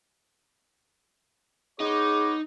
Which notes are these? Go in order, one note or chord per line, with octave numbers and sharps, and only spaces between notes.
B3 D#4 G#4 C#5 D6